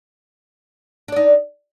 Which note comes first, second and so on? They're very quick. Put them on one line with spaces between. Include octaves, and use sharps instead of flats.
D4 D5 D#4